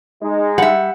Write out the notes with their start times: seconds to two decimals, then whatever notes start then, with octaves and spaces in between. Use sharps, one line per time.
0.22 G#3 D#4
0.58 G3 E5 F#5